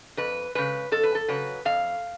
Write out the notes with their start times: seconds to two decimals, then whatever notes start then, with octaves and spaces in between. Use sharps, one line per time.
0.17 F2 B4
0.55 C#3 G#3 B4
0.92 F2 A4
1.03 B4
1.15 A4
1.28 C#3 F#3 B4
1.65 F2 F5